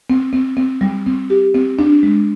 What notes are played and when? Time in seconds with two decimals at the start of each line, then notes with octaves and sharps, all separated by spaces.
0.10 C4
0.33 C4
0.57 C4
0.81 G3
1.06 C4
1.30 G4
1.55 C4
1.79 D4
2.03 G#3